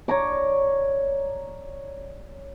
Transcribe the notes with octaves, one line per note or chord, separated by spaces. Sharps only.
C#5 D5 A#5 D6